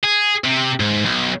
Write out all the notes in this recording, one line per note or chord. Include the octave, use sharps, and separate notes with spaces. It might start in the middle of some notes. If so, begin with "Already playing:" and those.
G#4
C3
G#2
B1